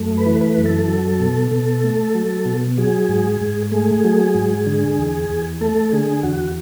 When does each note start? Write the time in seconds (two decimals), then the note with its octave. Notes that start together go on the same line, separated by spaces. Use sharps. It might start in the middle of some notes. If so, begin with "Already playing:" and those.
Already playing: F#2 A3
0.18 B4
0.26 E3
0.41 B4
0.57 F#2
0.66 A4
0.88 F#3
1.20 B2
1.52 B2
1.84 A3
2.15 F#3
2.46 B2
2.78 F#3 G#4
3.09 G#2
3.41 G#2
3.71 A3 G#4
4.04 F#3
4.35 G#2
4.66 D3
4.99 E2
5.29 E2
5.61 A3 A4
5.92 D3 G#4
6.23 E2 F#4